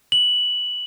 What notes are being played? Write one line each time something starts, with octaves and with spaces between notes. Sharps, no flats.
F#7